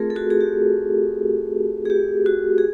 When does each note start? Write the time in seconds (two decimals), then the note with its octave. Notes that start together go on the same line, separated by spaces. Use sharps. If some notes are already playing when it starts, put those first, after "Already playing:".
Already playing: A3 C4 F4 G#4 A#4
0.10 A4
0.15 F#4 G#4
0.30 G#4
0.41 G4
1.85 G#4
1.90 G4
2.26 F#4
2.58 G#4